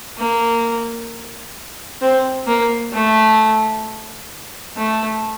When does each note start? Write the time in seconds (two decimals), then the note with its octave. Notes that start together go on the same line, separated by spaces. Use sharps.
0.17 A#3
2.01 C4
2.47 A#3
2.93 A3
4.76 A3